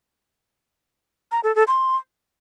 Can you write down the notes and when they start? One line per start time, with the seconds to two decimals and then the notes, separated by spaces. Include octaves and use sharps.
1.32 A#5
1.44 A4
1.56 A4
1.67 C6